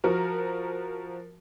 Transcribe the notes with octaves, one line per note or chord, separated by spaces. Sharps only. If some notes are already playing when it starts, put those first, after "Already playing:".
F3 F#4 A#4